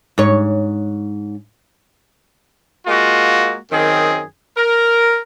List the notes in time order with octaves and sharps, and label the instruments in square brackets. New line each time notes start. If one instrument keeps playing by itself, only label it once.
[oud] G#2 C#5
[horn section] G#3 A#3 F4 F#4
F#2 D#3 C4 G#4
A#4